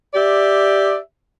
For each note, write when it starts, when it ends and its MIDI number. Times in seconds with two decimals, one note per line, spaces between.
0.14 0.97 67
0.14 0.97 74
0.14 0.97 76